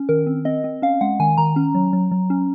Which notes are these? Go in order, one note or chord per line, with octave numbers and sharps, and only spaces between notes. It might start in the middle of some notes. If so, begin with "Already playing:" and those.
Already playing: C#4
D#3 A#4
C4
C4 D#5
C4
C#4 F5
G#3 F#5
D#3 G#5
D#3 A#5
C#4
F#3
F#3
F#3
C#4